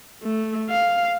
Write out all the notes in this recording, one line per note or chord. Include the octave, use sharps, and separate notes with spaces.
A3
F5